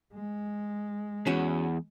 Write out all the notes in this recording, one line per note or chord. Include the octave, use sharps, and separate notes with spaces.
G#3
E2 C#4 F#4